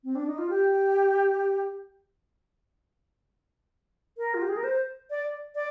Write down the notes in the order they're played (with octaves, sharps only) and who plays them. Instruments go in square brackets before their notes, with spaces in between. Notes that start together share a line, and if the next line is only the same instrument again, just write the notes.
[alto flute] C4
D4
D#4
F4
G4
A#4
F4
G4
G#4
A#4
C5
D5
D5